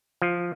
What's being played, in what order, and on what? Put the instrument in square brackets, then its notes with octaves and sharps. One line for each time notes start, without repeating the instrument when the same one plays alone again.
[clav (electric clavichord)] F3